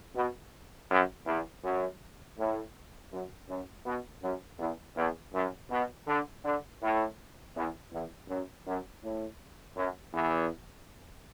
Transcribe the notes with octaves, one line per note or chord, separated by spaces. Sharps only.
B2
F#2
E2
F#2
A2
F#2
F#2
B2
F#2
E2
E2
F#2
B2
D3
D3
A2
E2
E2
F#2
F#2
A2
F#2
E2